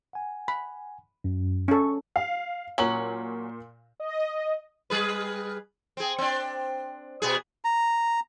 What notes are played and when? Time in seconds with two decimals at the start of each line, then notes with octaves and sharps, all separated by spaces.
0.13 F#5 G#5
0.48 B5
1.24 F#2
1.68 C#4 A4 C#6
2.16 F5
2.78 A#2 F#3 C#4 F#7
4.00 D#5
4.90 G3 G#4 B4
5.97 C4 G#4
6.18 C4 D4
7.22 B2 B3 G#4
7.65 A#5